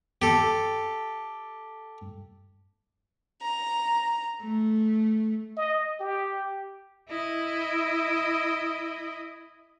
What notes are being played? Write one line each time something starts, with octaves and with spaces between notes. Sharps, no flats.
G4 A4
A#5
A3
D#5
G4
E4 D#5